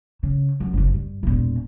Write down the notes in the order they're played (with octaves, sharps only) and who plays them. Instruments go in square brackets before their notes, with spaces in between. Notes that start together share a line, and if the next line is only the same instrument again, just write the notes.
[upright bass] C#3
F#2
F#1 C2
G2
E1 A#2